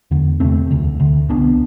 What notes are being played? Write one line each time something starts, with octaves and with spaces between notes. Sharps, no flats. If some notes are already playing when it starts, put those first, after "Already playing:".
E2 D3
E2 C3 A3 C4
D2 C3
D2 D3
C2 C3 B3 D4